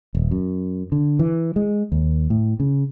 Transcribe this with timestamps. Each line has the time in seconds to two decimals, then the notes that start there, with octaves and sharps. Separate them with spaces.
0.15 D#1
0.31 F#2
0.92 D3
1.19 E3
1.56 G#3
1.92 D#2
2.30 A2
2.60 C#3